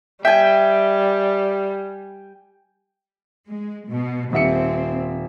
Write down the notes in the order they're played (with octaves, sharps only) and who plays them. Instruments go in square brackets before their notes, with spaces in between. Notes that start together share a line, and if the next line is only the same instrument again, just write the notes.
[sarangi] G3 [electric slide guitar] E5 [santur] G5 G#5
[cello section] G#3
B2
[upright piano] D#1 E5 C#7 [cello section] C4